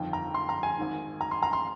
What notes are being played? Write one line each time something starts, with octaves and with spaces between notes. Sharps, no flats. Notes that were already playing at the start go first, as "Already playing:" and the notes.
Already playing: G1 F2 D#3 G5
A#5
C6
A#5
G#5
G#1 G#2 D#3
A#5
C6
A#5
C6